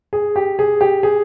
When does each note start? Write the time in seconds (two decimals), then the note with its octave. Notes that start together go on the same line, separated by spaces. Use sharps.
0.13 G#4
0.36 G4
0.59 G#4
0.81 G4
1.03 G#4